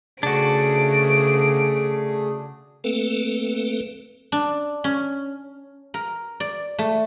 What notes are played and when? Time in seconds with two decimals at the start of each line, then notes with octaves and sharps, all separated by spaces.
0.23 C#3 A3 D4 F#4 G#4 D7
2.84 A3 A#3 C4 A4 B4
4.32 D4
4.84 C#4
5.94 A#4
6.40 D5
6.79 A3